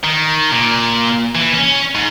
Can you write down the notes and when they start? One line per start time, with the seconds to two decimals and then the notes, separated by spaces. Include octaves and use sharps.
0.04 D#3
0.51 A#2
1.35 E3
1.54 C#4
1.95 G#2